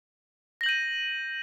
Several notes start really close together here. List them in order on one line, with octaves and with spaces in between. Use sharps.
A#6 F#7 G6 D#7